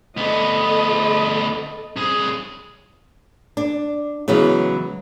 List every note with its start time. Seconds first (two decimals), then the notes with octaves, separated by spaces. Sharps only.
0.17 D2 B3 A4 D#5
1.96 C2 G#4
3.57 D4
4.28 C#3 E3 F#3 G#3 B3